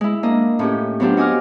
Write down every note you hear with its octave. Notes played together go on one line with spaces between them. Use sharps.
G#3 E4
A#3 D4 D#5
A2 C#4 G4
F#3 B3 C4 D4 F4 G4
F#4 D#5 G#5 D6 F6